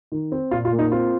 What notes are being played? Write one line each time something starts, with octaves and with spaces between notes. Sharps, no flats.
D#3
C4
A#2 F4
F4
A#3
D#4
C4 F4